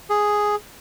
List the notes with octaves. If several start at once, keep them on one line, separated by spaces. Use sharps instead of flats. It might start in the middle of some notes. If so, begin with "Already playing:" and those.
G#4